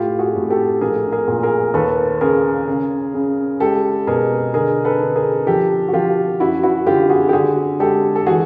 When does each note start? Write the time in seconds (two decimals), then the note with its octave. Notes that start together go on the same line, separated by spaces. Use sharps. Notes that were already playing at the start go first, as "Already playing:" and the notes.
Already playing: A2 F4 G4
0.19 F#4 G#4
0.35 A2
0.50 G4 A4
0.81 A#1 G#4 A#4
1.12 G#4 A#4
1.28 A#2
1.43 G#4 A#4
1.74 D#2 A4 B4
2.21 C#3 G#4 A#4
2.68 C#3
3.14 C#3
3.60 G#3 G4 A4
4.07 B2 G#4 A#4
4.54 D3 G#4 A#4
4.85 A4 B4
5.00 D3
5.16 G#4 A#4
5.47 F3 G4 A4
5.88 F#4
5.93 F3 F4 G4
6.40 F#2 E4 F#4
6.63 E4 F#4
6.87 D3 F4 G4
7.10 F#4 G#4
7.29 G4
7.33 D3 F#4 G#4
7.80 G#3 G4 A4
8.16 A4
8.26 E3 F#4 G#4